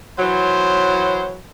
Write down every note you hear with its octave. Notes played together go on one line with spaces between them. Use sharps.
E3 F#3 C5